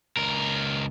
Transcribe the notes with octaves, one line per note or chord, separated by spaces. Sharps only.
C#2 A#4